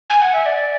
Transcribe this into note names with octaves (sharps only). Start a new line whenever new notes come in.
G#5
F#5
E5
D5